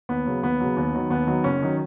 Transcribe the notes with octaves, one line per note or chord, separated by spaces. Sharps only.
D#2 B3
C#3 F#3
D#2 B3
C#3 F#3
D#2
D#3 F#3
D#2 B3
D#3 F#3
F#1 C#4
D#3 F#3